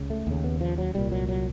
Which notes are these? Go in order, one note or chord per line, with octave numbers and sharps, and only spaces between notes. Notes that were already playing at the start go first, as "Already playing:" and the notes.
Already playing: C#2 C#3
A3
D#2 C#3
B3
F3
F#3
C2 A#2 G3
F#3
F#3